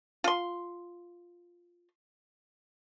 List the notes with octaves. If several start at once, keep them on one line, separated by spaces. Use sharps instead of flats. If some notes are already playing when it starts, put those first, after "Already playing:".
F4 C6